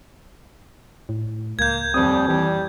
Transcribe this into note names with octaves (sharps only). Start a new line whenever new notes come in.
A2
C#2 A#3 G6 G#6
D#1 F2 G3 C4 D#6
E3 G3